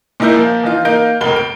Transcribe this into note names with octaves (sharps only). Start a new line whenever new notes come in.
A#2 D#4 E4 A#4 G6
F3 A#3
E3 D#4 F4
A#3 D#4 A#4 F5 G6 D7
F1 B1 A#4 B5 G7
D7